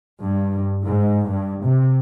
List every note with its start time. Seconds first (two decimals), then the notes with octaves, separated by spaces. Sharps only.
0.23 G2
0.85 G#2
1.29 G2
1.63 C3